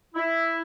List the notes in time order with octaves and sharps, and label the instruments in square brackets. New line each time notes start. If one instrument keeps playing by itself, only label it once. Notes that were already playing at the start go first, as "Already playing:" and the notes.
[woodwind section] E4